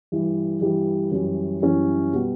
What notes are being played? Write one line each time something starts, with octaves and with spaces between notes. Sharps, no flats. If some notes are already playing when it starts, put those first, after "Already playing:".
G2 E3 G3
G2 E3 G3
F#2 E3 G3 C#4 E4
F#2 E3 G3 C#4 E4
B2 G3 B3